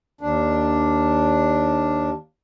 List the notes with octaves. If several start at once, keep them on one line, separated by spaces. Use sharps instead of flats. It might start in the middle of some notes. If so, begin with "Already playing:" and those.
D#2 D4